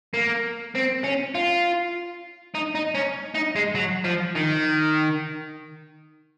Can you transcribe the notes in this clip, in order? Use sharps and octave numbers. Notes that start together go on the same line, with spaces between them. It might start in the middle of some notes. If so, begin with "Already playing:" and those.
A#3
C4
C#4
F4
D#4
D#4
C#4
D#4
G#3
F#3
F3
D#3